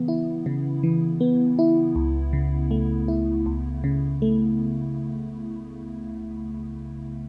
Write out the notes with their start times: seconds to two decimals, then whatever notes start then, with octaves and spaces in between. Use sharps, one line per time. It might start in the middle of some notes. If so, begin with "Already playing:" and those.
Already playing: C#3 E3 B3
0.08 E4
0.46 C#3
0.83 E3
1.21 B3
1.59 E4
1.96 C#2
2.33 C#3
2.71 A3
3.08 E4
3.46 C#2
3.84 C#3
4.22 A3